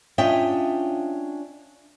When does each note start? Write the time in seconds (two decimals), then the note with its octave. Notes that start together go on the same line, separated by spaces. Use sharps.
0.18 C#4 D4 F4 D#5 E5 G5